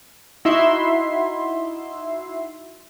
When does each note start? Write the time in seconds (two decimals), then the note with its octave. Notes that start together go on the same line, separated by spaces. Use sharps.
0.45 D#4 E4 F#4 E5 C6